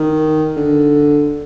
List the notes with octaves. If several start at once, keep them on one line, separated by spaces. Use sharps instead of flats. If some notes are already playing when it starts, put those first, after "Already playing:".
Already playing: D#3
D3